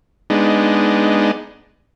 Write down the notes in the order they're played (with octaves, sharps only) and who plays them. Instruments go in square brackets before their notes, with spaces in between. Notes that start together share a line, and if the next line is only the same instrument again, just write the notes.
[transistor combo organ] G#3 B3 D4 D#4